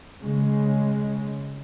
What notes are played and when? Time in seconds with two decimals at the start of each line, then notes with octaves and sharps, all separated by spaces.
0.23 C#3 G#3